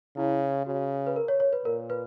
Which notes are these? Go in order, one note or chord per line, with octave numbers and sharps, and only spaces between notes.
C#3 E4
C#3 F#4
B4
A#4
C#5
C#5
B4
A#2 A#4
B4